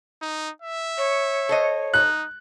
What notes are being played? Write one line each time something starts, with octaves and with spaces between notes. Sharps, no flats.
D#4
E5
C#5
A4 C5 D#5
D#4 F#6